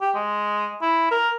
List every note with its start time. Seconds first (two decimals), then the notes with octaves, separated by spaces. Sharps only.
0.01 G4
0.15 G#3
0.82 E4
1.11 A#4